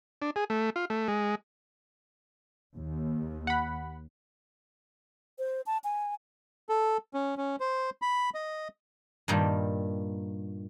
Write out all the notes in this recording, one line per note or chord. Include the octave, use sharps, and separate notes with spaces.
D4
G#4
A3
F4
A3
G#3
D#2
F#5 B5
C5
A5
G#5
A4
C#4
C#4
C5
B5
D#5
G2 A#2 D#3 G3 A#3